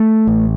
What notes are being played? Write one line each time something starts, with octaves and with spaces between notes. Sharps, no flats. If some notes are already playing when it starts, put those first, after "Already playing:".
Already playing: A3
A1